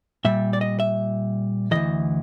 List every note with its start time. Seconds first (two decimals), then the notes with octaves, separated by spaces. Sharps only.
0.25 A#2 G3 E5
0.53 D5
0.61 D#5
0.80 E5
1.71 D2 C3 E3 D#5